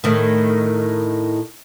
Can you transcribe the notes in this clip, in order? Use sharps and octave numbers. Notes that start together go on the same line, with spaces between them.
A2 D#3